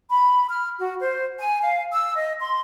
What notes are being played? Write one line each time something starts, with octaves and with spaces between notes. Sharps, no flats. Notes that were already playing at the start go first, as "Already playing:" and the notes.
B5
F6
F#4
C5
G#5
F5
E6
D#5
C6